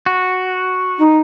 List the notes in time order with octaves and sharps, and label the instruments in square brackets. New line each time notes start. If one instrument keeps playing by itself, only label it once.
[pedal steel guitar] F#4
[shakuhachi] D#4